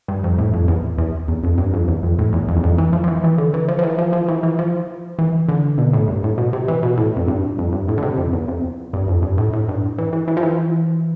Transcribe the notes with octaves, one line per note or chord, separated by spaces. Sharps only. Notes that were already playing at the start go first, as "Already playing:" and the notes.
G2
F2
A2
F2
E2
E2
E2
F2
G2
F2
E2
F2
A2
E2
F2
E2
F2
E3
F3
F3
E3
E3
D3
E3
F3
F3
E3
F3
F3
E3
E3
F3
E3
D3
B2
A2
G2
A2
B2
C3
E3
B2
A2
F2
G2
F2
G2
A2
D3
C3
F2
E2
F2
G2
F2
G2
A2
A2
G2
E3
E3
E3
F3
E3